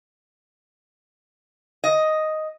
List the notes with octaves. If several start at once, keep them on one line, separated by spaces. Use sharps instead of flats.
D#5